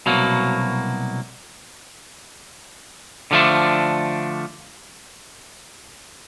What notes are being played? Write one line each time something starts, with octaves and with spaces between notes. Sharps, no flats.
C2 B2 F#3 A#3
D3 F3 A3 D4